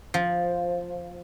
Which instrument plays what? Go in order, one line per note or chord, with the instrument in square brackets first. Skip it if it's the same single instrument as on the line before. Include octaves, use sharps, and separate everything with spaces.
[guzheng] F3